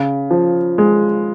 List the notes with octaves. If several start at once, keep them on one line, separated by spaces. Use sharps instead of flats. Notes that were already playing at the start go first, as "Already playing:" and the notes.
Already playing: C#3
F3
G#3